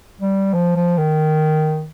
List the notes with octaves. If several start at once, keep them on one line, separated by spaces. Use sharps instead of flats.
G3
F3
F3
D#3